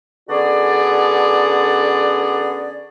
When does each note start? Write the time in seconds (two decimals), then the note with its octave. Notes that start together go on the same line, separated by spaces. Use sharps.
0.30 D3 B3 C#4 F#4 G#4 D5